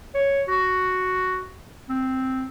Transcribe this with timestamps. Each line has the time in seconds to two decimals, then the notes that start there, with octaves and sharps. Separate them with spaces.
0.15 C#5
0.48 F#4
1.89 C4